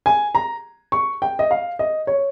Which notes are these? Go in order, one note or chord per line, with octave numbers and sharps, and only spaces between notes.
G#5
A#5
C#6
G5
D#5
F5
D#5
C#5